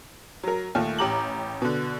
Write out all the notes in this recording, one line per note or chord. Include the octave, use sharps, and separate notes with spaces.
F#3 A#4
D#2 A#2 A3
A1 G4 A#5 D6 F#7
B2 D3